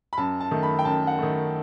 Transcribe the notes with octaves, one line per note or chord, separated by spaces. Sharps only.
B5
F#2 A5
A5
D#3 A3
B5
G5
F#2 A5
F#5
D#3 A3